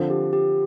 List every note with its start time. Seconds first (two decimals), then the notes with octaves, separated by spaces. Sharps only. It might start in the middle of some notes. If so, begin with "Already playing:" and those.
Already playing: D3 F3 C4
0.10 G4
0.33 G4